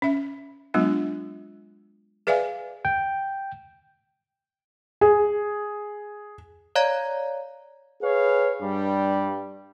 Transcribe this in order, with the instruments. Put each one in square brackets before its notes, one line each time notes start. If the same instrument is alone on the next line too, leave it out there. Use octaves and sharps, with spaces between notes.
[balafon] C#4 E5
F#3 G#3 B3 D4 F4
G#4 B4 D5 E5 F5 G#5
[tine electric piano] G5
[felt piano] G#4
[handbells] C#5 D5 F5 A#5 G#6
[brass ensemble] G#4 B4 C#5 F5
G2 G3